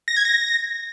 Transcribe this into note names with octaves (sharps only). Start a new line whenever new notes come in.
A#6
G#6
A#6